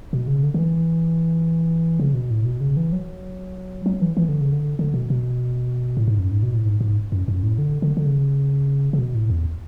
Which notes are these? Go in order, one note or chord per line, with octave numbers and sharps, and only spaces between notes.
B2
C#3
D3
D3
E3
C#3
B2
A2
B2
C#3
E3
F#3
F#3
E3
E3
D3
C#3
D3
D3
B2
B2
A2
G#2
F#2
G#2
B2
A2
G#2
G#2
F#2
F#2
A2
D3
D3
D3
C#3
C#3
B2
A2
E2